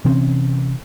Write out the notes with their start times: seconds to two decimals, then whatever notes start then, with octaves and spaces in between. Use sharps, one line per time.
0.05 C3 E3 C4 C#4